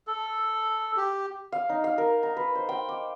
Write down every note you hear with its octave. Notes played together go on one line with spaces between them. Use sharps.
A4
G4
F5
D#4
F5
A#4
A#5
B4
C5
G5
D6